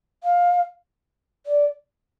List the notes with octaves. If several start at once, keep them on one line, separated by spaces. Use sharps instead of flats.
F5
D5